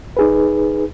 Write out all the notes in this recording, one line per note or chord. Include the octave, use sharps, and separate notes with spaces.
D#4 G#4 B4